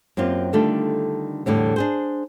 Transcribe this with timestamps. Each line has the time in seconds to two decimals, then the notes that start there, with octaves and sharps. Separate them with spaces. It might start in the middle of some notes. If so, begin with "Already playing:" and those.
0.17 F#2 A#3 C4 F4 G4
0.53 D3 D#3 G3 A3 D4 F4
1.46 E2 A2 D3 G3
1.76 D4 G#4 C5